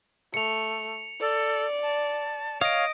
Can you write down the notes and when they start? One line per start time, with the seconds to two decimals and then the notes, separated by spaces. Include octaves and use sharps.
0.34 A3 C#7 F7
1.21 A4 D5
1.83 A5
2.61 C#5 D#5 F5 D#6 D7